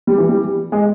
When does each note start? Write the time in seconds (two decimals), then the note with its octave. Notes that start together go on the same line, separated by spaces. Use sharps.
0.07 G3
0.18 E3
0.29 G3
0.72 G#3